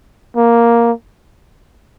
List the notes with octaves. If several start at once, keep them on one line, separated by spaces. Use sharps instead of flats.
A#3